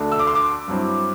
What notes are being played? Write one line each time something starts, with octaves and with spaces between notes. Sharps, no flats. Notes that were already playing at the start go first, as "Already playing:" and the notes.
Already playing: D2 D3 A3 D4
E6
D6
C6
D6
G2 F#3 C4 E4